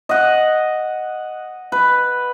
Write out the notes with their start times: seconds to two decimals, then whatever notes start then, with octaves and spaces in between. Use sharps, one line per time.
0.09 D#5 F#5
1.72 B4